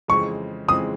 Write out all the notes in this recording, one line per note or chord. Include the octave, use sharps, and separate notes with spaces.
F2 C#3 E3 G#3 C4 C#6
F2 C#3 E3 G#3 C4 D#6